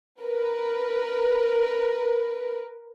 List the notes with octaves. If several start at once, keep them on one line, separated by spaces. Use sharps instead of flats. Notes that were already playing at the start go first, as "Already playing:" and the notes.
A#4 B4